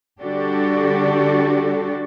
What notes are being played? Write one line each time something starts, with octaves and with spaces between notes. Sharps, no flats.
D3 G3 D4 F#4 G4 A4